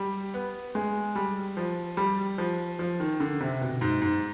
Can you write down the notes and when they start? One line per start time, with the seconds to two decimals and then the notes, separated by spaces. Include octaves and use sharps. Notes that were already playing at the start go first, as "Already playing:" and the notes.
Already playing: G3
0.34 B3
0.75 G#3
1.15 G3
1.57 F3
1.97 G3
2.38 F3
2.79 F3
3.00 D#3
3.20 D3
3.40 C3
3.61 B2
3.81 G#2
4.02 G#2